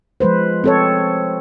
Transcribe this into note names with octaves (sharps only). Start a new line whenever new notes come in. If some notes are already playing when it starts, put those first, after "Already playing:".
F3 G#3 B4 C5
C4 A4 C#5